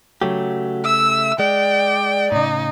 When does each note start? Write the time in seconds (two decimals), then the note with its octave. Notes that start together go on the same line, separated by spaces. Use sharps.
0.22 C#3 F#3 A3 G4
0.85 E5 E6
1.39 G#3 D5 G5
2.32 A2 C#3 D#4